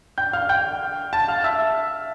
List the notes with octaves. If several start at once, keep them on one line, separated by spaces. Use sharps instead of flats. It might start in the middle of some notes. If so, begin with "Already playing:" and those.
G5 G6
F5 F6
G5 G6
A5 A6
F5 F6
E5 E6